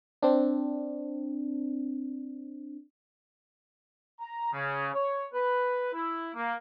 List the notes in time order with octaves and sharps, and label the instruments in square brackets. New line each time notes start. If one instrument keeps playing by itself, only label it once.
[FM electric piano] C4 D4
[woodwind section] A#5
C#3
C#5
B4
E4
A#3